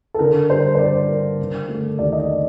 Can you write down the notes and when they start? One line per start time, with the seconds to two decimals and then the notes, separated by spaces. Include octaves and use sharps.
0.14 A4
0.19 D3 A#4
0.50 G3 C5
0.75 C5
0.79 G2 D5
1.09 A#3
1.39 D3
1.68 A3
1.99 D#2 D5
2.12 D#5
2.19 D5